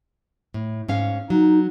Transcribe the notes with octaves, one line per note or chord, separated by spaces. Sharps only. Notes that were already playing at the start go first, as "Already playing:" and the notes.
A2
G#2 C#4 F5
F#3 D#4